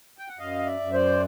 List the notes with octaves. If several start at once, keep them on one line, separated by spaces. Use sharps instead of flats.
G5
F#5
F#2 D#5 F5
D5 E5
F#2
C5 D5